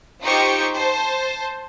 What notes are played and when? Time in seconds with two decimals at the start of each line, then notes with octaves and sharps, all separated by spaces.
0.23 D#4 F4 G4 C5 G5 C#6
0.76 C5 A5